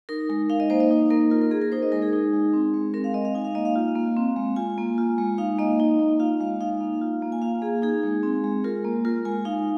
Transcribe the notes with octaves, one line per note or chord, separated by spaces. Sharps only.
D#4 A#4
G#3 A#4
D#4 F5
D#5
A#3 C5
D#5
D#4
A#3 A#4
F4 A#4
A#4
A#3 G#4
A#4
D#4 C5
D#5
G#3 A#4
G#4
D#4
G#3
C4
G#3
C4 A#4
F5
G#3 D#5
F5
D#4 G#5
F5
A#3 D#5
F5
F4
A#3
C4
G#3
F4 G#5
A#3
F4
G#3
D#4 F5
A#3 D#5
D#4
A#3
F4 F5
G#3 F5
D#4 F5
A#3
F4
A#3
G#5
F4 F5
A#3 G#4
D#4 G#4
G#3
C4
G#3
F4 A#4
A#3
F4 A#4
G#3 G#5
D#4 F5